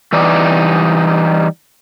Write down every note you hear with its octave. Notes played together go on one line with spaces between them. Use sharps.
E3 G3 D#4 D5